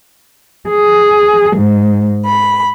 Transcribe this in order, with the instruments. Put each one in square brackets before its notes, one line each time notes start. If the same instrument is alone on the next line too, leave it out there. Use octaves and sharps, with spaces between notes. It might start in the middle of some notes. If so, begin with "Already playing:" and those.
[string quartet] G#4
G#2
B5